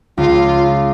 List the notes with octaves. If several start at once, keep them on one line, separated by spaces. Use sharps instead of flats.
C#2 F4